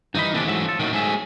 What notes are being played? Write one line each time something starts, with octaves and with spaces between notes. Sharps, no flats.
G2 D#3 E3 D#4 B5
D#2 C3 E3 A3 D4
G#2 F#3 E5
F3 A4
D#2 A2 D#3 F#3
G#2 F#3 A3 G#4 E5